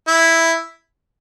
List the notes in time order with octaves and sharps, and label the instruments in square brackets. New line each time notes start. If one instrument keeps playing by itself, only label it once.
[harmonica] E4